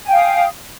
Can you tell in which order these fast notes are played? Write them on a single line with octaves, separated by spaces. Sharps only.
G#5 G5 F5 D#6